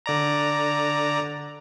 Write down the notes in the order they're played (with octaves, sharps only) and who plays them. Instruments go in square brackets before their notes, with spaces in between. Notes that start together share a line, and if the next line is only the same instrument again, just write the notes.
[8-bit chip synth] D3 D5 A#5